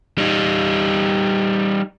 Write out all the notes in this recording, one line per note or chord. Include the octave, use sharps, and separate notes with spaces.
G3 D#4